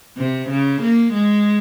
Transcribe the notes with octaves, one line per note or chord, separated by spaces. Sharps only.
C3
C#3
A#3
G#3